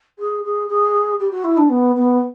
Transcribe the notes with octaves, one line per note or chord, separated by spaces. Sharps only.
G#4
G#4
G#4
G4
F#4
E4
D4
B3
B3